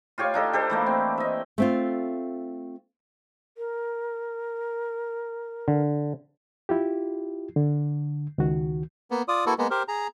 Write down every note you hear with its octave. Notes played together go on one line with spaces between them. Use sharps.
F4 G4 C#5 F5
D4 D#4 A4
G4 A4 C5
E3 A3 A#3
C4
D#5 E5
A3 C4 F4
A#4
D3
E4 F4 G4
D3
C#2 D#3 F#4
A#3 B3
F4 D5 D#6
A#3 E4 F#4 A4 B4
G#3 A#3 B3
G4 A#4 C5
G#4 A#5